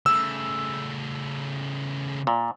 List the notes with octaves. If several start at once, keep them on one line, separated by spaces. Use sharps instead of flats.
C#3 A3 E6
A#2